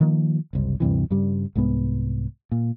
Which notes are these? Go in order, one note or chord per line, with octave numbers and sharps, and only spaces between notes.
D#3 F3 A#3
F#1 C2 C3
D2 G2 C3 E3
G2 C#3 G3
C2 G#2 G#3 B3
A#2